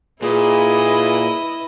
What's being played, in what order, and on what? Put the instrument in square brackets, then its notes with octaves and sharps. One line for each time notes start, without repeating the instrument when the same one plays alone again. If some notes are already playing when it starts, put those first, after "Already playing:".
[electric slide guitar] A#2 [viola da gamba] E4 B4 D#5 [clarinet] G#4